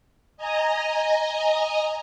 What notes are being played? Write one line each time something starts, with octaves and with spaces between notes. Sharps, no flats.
D#5 G#5 A#5